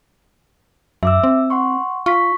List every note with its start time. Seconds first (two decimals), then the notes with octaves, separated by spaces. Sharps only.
1.03 F#2 E5 D6 E6
1.24 C4
1.50 F#5 C6 C#6
2.06 F4 C#6 B6